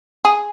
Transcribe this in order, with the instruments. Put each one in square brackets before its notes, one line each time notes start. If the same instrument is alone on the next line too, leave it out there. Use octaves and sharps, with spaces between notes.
[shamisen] G#4